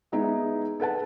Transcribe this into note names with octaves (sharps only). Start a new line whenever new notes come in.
G#3 B3 D#4 E4 G#4 E5
A4 B4 F#5 A5